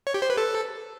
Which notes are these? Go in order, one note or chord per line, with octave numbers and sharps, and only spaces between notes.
C#5
G4
C5
B4
A4